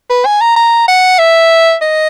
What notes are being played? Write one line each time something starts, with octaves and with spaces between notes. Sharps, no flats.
B4
G#5
A#5
A#5
F#5
E5
D#5